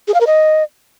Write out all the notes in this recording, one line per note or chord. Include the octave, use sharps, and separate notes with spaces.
G#4
F5
A#4
D#5